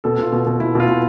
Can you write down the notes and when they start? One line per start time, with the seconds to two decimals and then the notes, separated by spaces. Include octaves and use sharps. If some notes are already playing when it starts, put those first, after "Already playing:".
0.04 B2 A4
0.18 B2 F4
0.32 B2
0.46 B2
0.60 B2 E4
0.75 B2
0.80 F4
0.88 B2